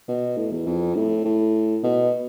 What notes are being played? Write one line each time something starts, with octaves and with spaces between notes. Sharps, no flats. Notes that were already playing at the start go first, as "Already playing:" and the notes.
B2
A2
E2
F2
A2
A2
B2